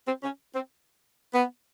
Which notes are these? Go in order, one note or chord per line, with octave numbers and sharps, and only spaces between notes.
C4
C#4
C4
B3